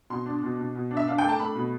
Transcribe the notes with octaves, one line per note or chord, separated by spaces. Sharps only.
B2 C6
D4
B2
B2
B2
D4
E5
D4 F5
A3 G5
A5
A3 B5
B2